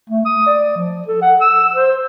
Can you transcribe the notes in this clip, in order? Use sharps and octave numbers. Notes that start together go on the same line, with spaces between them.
A3
D#6
D5
F3
A4
F#5
E6
C5